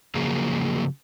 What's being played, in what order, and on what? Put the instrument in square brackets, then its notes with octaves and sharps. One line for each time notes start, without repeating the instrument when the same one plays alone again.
[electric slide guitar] C#3 F3 F#3 A#3 G#4